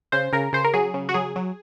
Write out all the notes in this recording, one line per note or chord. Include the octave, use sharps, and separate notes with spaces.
C#3 C5
C#3 A#4
C#3 C5
A#4
F#3 G#4
C#3
F#4
F#3 G#4
F#3